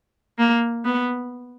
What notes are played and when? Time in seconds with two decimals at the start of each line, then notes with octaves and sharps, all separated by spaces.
0.39 A#3
0.85 B3